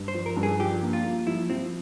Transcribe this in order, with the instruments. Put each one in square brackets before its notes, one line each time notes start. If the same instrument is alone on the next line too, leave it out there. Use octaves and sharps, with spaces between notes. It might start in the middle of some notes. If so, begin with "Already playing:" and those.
Already playing: [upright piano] G2
[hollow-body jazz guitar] C5
[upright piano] F3
[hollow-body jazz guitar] A#4
[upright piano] G2
[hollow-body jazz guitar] G#4
[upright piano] F3 [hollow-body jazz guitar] G4
[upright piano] A#3
[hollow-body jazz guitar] F4
[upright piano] A#3
[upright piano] F3 [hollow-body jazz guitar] E4
[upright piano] F3 [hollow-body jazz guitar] C4